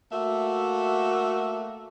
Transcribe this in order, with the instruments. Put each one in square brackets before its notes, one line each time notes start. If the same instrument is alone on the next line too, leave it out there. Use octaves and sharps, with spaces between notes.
[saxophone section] A3 A#3 F#4 E5